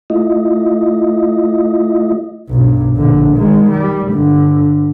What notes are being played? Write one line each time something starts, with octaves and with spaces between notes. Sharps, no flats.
A3 E4 F4 D#5
B1 G2
A#1 D3
D#3 G#3
G3
G2 D3